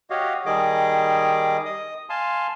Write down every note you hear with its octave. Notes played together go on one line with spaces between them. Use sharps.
F#4 G4 C#5 D#5 F5
D#3 G3 G#4 D#5 D6
D#5 D#6
F5 G#5 A5 C6